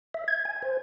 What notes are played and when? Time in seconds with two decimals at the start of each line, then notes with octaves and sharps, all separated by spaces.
0.14 E5
0.28 G#6
0.45 G#5
0.63 C5